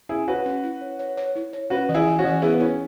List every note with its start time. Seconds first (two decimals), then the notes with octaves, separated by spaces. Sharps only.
0.09 C#4 E4 G#4
0.28 F#4 B4 C#5
0.46 C#4
0.64 E4
0.81 C#5
0.99 C#5
1.17 C#5
1.35 E4
1.53 C#5
1.70 C#4 F#4 B4
1.89 E3
1.94 E4 G#4
2.07 E3
2.19 C#4 F#4
2.24 E3
2.42 B3 E4 G#4
2.53 B3
2.60 C#4 E4